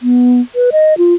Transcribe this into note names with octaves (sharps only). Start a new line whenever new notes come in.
B3
B4
D#5
F4